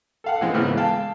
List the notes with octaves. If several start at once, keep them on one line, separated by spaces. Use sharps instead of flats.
A4 F5 F#5
E3 G#3 C4
G#2 C#3 E3 B3
F5 G5 A5